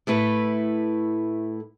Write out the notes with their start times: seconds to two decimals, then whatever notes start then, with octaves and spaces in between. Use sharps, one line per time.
0.07 A2 A3 E4 B4